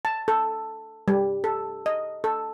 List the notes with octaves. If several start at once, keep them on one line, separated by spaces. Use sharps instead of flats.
A5
A4
G3
A4
D#5
A4